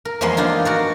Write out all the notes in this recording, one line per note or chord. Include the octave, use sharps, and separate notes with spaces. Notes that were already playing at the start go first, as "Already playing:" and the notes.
A#4
E2 F3 G#3 A#3 B3 C6
D4 D#4 F4 G#4
F#4 A#4 D5